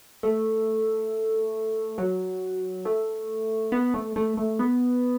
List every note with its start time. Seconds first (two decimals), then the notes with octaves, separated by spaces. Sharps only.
0.23 A3
1.98 F#3
2.85 A3
3.72 B3
3.94 A3
4.16 A3
4.37 A3
4.59 B3